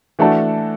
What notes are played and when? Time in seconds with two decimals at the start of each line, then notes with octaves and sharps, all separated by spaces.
0.19 E3 A3 D4 F#4 A4